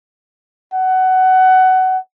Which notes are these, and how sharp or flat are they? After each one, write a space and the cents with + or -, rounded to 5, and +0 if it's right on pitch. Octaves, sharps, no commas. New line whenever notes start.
F#5 +20